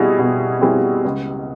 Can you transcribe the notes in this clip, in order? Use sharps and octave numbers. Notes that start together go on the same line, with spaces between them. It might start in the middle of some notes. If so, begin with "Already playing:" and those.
Already playing: B2 G3 C4 E4 G#4
B2
G3 C4 E4 G#4
C#2